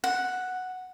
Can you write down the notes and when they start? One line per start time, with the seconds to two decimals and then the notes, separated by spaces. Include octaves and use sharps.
0.04 F#5